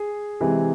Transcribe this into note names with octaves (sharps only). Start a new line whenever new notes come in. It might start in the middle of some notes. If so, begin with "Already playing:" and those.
Already playing: G#4
C3 E3 G#3